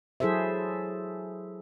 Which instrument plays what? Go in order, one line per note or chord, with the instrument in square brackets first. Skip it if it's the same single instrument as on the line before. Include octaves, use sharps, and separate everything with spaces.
[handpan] F#3 E4 G#4 A4 C5 E5